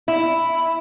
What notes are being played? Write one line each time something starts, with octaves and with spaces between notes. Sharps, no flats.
E4